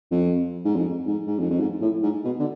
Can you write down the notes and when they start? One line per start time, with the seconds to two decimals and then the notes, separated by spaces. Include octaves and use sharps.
0.11 F2
0.65 G#2
0.75 F2
1.07 G#2
1.27 G#2
1.39 F2
1.50 F2
1.60 G#2
1.81 A2
2.03 G#2
2.25 B2
2.40 D3